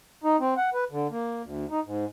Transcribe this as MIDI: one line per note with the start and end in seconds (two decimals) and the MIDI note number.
0.24 0.36 63
0.40 0.54 60
0.57 0.70 78
0.74 0.84 71
0.91 1.07 50
1.11 1.42 58
1.43 1.65 38
1.71 1.80 63
1.85 2.05 44